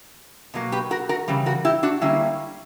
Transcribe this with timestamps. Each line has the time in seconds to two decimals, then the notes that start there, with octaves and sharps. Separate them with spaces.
0.54 B2 F#3 A#3
0.72 G4 B4
0.91 F#4 A#4
1.09 F#4 A#4
1.28 C#3 E3 G3
1.46 F#4 A#4
1.65 E4 G4
1.83 D4 F#4
2.01 D3 G3 A#3 C#4 E4